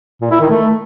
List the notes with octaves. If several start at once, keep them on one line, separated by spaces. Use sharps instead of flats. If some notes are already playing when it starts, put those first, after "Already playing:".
A#2
E4
D#3
A3